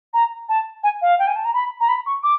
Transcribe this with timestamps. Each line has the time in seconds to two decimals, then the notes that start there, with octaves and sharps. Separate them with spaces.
0.13 A#5
0.49 A5
0.83 G#5
1.02 F5
1.19 G5
1.27 G#5
1.36 A5
1.45 A#5
1.54 B5
1.80 A#5
1.88 B5
2.06 C#6
2.23 D6